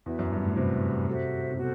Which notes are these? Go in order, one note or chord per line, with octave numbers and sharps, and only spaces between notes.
E2 F#4 B4 E5
F#2
G2
A2
C3 F#4 B4 E5
F#4 A4 C5 E5
C3
B2 F#4 A4 C5